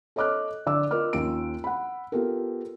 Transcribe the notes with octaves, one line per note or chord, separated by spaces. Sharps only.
A4 C#5 D#5 D6 F6 F#6
D3 D5 D6 E6
F4 A#4 D#5 D6 F6
D#2 C#4 F4 D7
F#5 B5
B3 F4 G4 A4 A#4